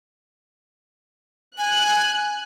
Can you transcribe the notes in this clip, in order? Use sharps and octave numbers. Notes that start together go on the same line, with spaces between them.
G#5 F#6